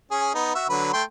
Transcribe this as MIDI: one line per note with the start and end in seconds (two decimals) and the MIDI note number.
0.11 0.31 61
0.11 0.31 68
0.34 0.54 59
0.34 0.54 63
0.55 0.65 66
0.55 0.65 76
0.70 0.92 50
0.70 0.92 54
0.70 0.92 71
0.93 1.03 57
0.93 1.03 79
0.93 1.03 84